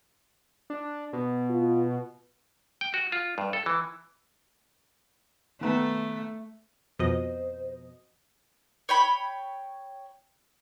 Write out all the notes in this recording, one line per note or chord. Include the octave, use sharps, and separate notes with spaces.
D4
B2
F4
G5
F#4
F4
G2
A4
E3
D#3 A3 B3 A#5
F2 B2 C5 D#5
C#5 G5 B5